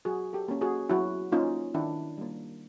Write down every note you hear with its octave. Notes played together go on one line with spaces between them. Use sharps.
F#3 F#4 G#4
G4 A4
A#3 C#4
F#4 G#4
F#3 E4 F#4
A#3 C#4 D#4 F4
D#3 D4 E4
G3 A#3